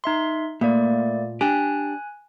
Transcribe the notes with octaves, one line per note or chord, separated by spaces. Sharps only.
D#4 E5 C6
A#2 A3 A#3 D5
D4 G4 G#5 F#6